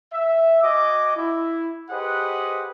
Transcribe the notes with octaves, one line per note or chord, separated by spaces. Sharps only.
E5
F#4 D#5 G#5 D6
E4
G4 G#4 B4 C5 D#5 F#5